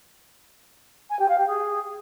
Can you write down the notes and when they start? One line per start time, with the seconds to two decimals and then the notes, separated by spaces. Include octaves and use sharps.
1.10 G#5
1.19 G4
1.28 F5
1.38 G4
1.47 G#4